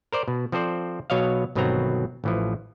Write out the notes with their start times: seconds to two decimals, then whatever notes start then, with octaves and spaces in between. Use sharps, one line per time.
0.12 A#4 C5 D5
0.28 B2
0.52 F3 C4 A4 C5 D5
1.10 B2 F#3 C#5 D#5 F5
1.55 G1 B2 D#3 F#3 C4 A#5
2.24 A1 E3 F3